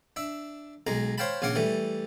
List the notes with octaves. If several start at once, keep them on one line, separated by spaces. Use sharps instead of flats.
D4 E5
B1 G#3 A#5
C5 C#5 F5 G5 A5 B5
A#1 C#3 F5 F#5 D6
E3 G3 A3